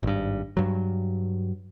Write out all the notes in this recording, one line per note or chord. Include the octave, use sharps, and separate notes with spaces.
G#1 G2
G2 F#3